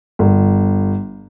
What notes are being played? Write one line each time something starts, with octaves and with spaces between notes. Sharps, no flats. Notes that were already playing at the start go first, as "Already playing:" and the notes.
G1